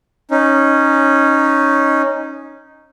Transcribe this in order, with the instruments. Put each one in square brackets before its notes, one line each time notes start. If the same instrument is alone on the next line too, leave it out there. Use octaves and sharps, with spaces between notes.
[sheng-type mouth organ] C#4 D#4